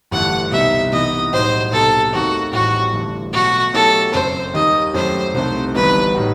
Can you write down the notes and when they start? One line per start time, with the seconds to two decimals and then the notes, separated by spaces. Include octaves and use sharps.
0.11 G1 G2 E3 A3 F#5
0.52 C2 B2 G3 C4 D#4 E5
0.92 C2 C3 E3 B3 D#4 D#5
1.32 B1 A2 G3 D#4 F#4 C5
1.72 C2 B2 G3 D#4 F#4 A4
2.12 D#2 D#3 A3 C4 D#4 F#4
2.52 A1 A2 G3 C4 D#4 F#4
2.93 G1 G2 E3 A3
3.33 B1 B2 A3 F#4
3.73 B2 F#3 A3 E4 G4 A4
4.13 F#1 F#2 F#3 C4 C5
4.54 D#2 D#3 G3 D#4 D#5
4.93 F#2 F#3 A3 E4 G4 C5
5.34 C2 C3 D#3 A3 C5
5.74 G1 G2 E3 B3 D#4 B4
6.15 A2 G3 D#4 F#4